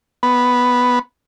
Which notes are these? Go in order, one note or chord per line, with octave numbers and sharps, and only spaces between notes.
B3